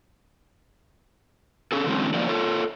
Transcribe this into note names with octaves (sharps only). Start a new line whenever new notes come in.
C#4 G#4 A4
D3 E3 F#3 G#3 C4 C#4
F3 A#3 C#4 D#4 F#4 D5
F4 A4 C#5